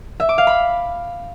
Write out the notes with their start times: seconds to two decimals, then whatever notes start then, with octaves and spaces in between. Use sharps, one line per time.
0.20 E5
0.29 D6
0.38 F5
0.47 B5